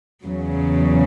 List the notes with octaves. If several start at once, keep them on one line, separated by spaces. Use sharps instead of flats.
E2 C#3 F#3